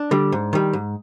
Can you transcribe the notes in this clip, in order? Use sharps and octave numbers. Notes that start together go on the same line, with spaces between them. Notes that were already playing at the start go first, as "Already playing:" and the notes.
Already playing: D4
D3 G3
G#2
D#3 G3
G#2